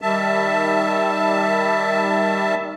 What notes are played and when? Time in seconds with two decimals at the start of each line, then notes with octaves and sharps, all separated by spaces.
0.02 D#3 G3 E5 A5